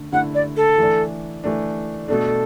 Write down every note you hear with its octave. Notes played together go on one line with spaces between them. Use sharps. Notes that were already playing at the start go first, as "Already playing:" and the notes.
Already playing: D3 A3
D3 A3 E4 F#5
D5
A4
E3 A3 D4
E3 A3 D4
B2 A3 D4 A4